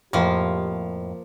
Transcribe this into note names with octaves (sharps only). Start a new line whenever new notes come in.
F2 A2 F3 A#3 G4